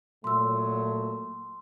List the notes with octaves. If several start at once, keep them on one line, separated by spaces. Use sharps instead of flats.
A#2 F#3 A3 C6 E6